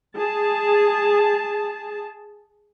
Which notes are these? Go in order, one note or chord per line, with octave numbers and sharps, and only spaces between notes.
G#4 A5